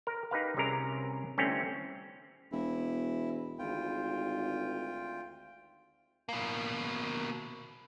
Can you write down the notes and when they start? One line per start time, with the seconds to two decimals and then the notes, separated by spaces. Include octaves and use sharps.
0.07 A#4
0.31 D#4 G4 B4 F5
0.57 C2 C3 C#4 G#4 A#4 A#5
1.38 D3 E3 G3 A3 C4 C#4
2.52 E1 E4
3.59 G#1 D2 F4 G5
6.29 B2 A#3